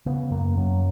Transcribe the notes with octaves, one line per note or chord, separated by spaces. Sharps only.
C#3 B3
F#2 A#3
F#2 F#3